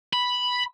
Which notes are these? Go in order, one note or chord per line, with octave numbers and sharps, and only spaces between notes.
B5